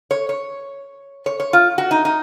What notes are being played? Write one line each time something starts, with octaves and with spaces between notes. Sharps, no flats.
C#5
C#5
C#5
C#5
F4
F#4
D#4
D#4